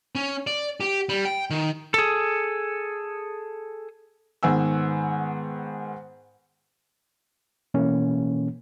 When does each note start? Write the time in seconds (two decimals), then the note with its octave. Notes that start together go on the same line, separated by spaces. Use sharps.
0.15 C#4
0.47 D5
0.80 G4
1.09 G3
1.25 G5
1.50 D#3
1.94 G#4 A4
4.43 G#2 D#3 B3 G#5 E6
7.74 B2 E3 A#3 C#4